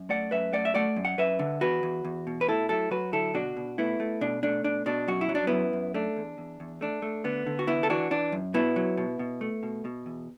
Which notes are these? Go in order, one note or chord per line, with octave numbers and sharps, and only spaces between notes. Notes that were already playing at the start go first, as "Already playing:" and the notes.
Already playing: F#2
A3 D5 F#5
F#2 B4 E5
A3 D5 F#5
E5
A3 D5 F#5
F#2
F#5
F#2 B4 E5
D3
E2 F#4 B4
E2
E2
B2
B4
A3 E4 A4
F#3 E4 A4
F#3 F#4 B4
D3 E4 A4
B2 D4 F#4
B2
A3 B3 E4
A3
B2 D4
A3 D4
B2 D4
B2 D4
F#2 F#4
E4
F#3
D4
F#2 B3 E4
F#2
A3 D4
E2
E2
E2
A3 D4
A3
D3 B3
D3
F#4
E3 B3 E4
A4
E3 D4 F#4
E3 D4
F#2
B2 B3 E4
F#3
B2
B2
A3
B2
B2
E2